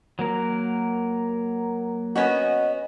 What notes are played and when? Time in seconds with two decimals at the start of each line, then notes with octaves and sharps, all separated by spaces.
0.19 F#3 A#3 A#4
2.16 B3 C#4 F#4 D#5